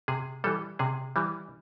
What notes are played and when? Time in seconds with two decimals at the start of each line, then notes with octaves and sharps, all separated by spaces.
0.08 C3 G#4
0.44 E3 G3 A4
0.79 C3 G#4
1.16 E3 G3